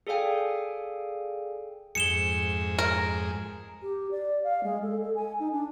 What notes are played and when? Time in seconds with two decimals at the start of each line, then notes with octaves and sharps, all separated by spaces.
0.07 G#4 A4 D5 F5 G5 G#5
1.95 F2 G#2 G#4 C#7 E7 G7
2.79 A#4
3.83 G4
4.11 D5
4.44 F5
4.64 G#3
4.83 A4
5.02 A4
5.15 G#5
5.40 D#4
5.52 D4